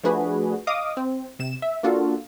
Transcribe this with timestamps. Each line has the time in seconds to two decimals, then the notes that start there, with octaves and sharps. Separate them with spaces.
0.04 F3 A3 D4 F#4 G#4 B4
0.67 D#5 F5 D6 D#6
0.97 C4
1.39 C3 E7
1.62 E5
1.83 A#3 D4 F4 F#4 A4